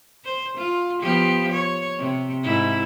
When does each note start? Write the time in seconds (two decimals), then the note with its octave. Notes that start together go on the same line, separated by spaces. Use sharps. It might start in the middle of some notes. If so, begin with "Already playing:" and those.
0.25 C5
0.57 F4
1.01 F3 B3 G4
1.52 C#5
1.98 C3
2.43 G#2 E4